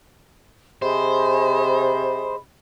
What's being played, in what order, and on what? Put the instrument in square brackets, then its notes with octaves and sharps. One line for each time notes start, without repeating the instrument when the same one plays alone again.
[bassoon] C3 [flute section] G#4 D#5 B5 [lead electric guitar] C5